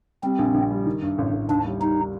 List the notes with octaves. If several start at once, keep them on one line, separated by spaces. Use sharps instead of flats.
G3 C4
A#1
A#1
G3
D#3
G2
A1
A1
D#2 D4
G3
G3 D#4